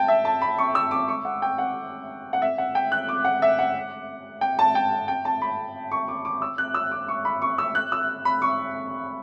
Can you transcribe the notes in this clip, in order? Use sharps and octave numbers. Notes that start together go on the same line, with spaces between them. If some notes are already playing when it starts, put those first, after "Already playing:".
Already playing: G5 A5
E5
A5
B5
C#6
E6
D6
C#6
F#5
G5
F#5
F#5
E5
F#5
G5
F#6
D6
F#5
E5
F#5
G5
A5
G5
G5
A5
B5
C#6
D6
D6
E6
F#6
E6
D6
C#6
B5
C#6
E6
F#6
E6
B5
C#6